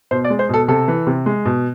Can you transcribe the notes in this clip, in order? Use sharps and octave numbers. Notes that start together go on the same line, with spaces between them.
B2 C5
D5
G#3
C5
B2 A4
C3 A4
E3
C3
G#3
B2